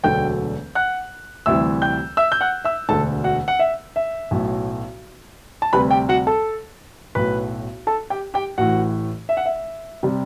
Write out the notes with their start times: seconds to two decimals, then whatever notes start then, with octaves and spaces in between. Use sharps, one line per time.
0.03 E1 D2 D3 F#3 A3 G5 G6
0.75 F#5 F#6
1.46 D2 C3 E3 G3 E5 E6
1.82 G5 G6
2.17 E5 E6
2.32 G6
2.41 F#5 F#6
2.65 E5 E6
2.89 E1 D2 D3 A4 A5
3.24 F#4 F#5
3.48 F#5
3.59 E5
3.96 E5
4.31 B1 A2 F#3
5.62 A5
5.73 D2 C3 G3 B4 B5
5.91 G4 G5
6.09 F#4 F#5
6.27 A4 A5
7.15 B1 A2 F#3 B4 B5
7.87 A4 A5
8.10 G4 G5
8.34 G4 G5
8.58 A1 A2 E3 F#4 F#5
9.29 E5
9.37 F#5
9.46 E5
10.03 C3 G3